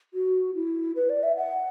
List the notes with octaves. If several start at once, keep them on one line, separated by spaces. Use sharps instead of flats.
F#4
E4
B4
D5
E5
F#5